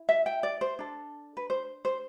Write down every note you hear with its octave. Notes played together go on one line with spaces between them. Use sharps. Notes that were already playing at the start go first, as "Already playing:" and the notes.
Already playing: E4
E5
G5
D5
C5
D4 A4
B4
C5
C5